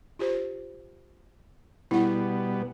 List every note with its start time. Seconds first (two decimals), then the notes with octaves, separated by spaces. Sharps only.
0.19 F4 G4 C5
1.91 B2 G3 B3 E4 F#5